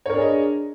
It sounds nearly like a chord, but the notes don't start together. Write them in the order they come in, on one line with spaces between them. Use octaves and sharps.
C#5 A#4 D4 G#4 D#5